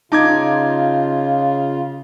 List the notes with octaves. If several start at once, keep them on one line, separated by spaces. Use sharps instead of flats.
C#3 D#4 F4 A5 D6 G#6